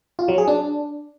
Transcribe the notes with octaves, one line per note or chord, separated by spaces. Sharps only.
F4
F#3
G#4
D4